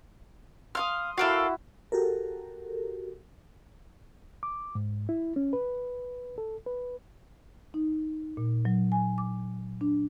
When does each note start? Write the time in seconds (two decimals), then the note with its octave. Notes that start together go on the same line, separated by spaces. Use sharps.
0.75 F5 C6 D#6 F6
1.18 E4 F#4 A4 A#4 F5
1.92 F#4 G4 A4 A#4
4.43 D6
4.75 G#2
5.09 E4
5.36 C#4
5.53 B4
6.38 A4
6.66 B4
7.74 D#4
8.37 A#2
8.65 F#3
8.92 G#5
9.18 D6
9.81 D4